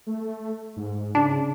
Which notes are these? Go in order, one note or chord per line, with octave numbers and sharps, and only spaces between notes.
A3
G#2
C#3 D4